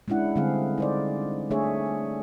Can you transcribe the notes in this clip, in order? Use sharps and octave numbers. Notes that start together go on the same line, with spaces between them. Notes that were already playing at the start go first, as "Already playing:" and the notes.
G#3 C#4 D4 E4 F#5
D3 G3 G#3 C4 G#4 F5
D#4 C5 D5
A3 D4 G#4 C#5 E5